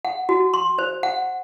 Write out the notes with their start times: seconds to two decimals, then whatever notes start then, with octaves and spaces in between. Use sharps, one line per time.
0.05 F#5
0.29 F#4
0.54 C6
0.79 C5
1.03 F#5